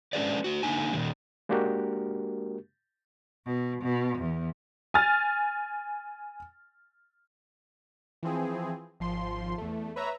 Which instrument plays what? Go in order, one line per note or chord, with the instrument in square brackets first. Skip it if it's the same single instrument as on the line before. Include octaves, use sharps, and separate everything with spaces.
[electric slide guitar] G#3 C#4 D4 G#4 B4 D5
A3 F#4
D3 A#3 D#4 G#5
A#2 D#3 G3
[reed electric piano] G#3 A#3 D4 F#4 G4 A#4
[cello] B2
B2
E2
[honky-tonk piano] G#5 F6 A6
[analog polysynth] E3 F3 C4 G#4
G#1 F3 C6
E2 A3
B4 C#5 E5 A#5